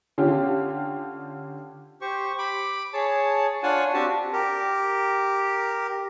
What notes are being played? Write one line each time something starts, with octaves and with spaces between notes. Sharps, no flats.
D3 C#4 F4 G4
G4 C5 C#6
B5 D6
G#4 C#5 A5
D4 F4 C#5 F#5 G#5 A5
C4 D4 F#4 G4 A5
G4 A#4